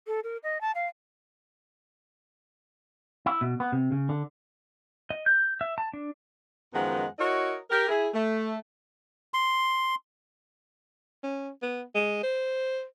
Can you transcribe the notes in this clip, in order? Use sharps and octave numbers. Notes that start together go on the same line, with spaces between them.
A4
A#4
D#5
A5
F5
E4
B2
B3
C3
C#3
D3
D#5
G6
E5
A5
D4
F#2 D#3 F3 G#3 B3 F#5
E4 F#4 A#4 C#5 D#5
G4 A#4
E4 G#4
A3
C6
C#4
B3
G#3
C5